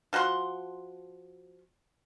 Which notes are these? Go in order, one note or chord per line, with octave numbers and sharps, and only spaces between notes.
F3 F#4 F#5 C6